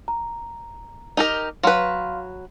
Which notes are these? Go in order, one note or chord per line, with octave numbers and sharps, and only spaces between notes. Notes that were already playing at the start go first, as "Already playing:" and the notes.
A#5
D#4 G4 A#4
F#3 B4 F5 C6 F6